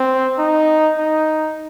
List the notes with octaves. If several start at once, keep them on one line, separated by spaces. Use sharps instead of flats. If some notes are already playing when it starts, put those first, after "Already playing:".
Already playing: C4
D#4
D#4